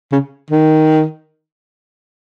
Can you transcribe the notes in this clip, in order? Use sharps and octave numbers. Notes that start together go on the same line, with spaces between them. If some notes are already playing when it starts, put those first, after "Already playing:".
C#3
D#3